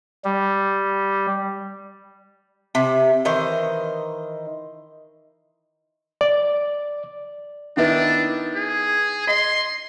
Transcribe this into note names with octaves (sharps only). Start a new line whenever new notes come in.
G3
C3
D#3 E3 C5 D#5
D5
D#3 B3 D4 E4
G#4
D#5 C6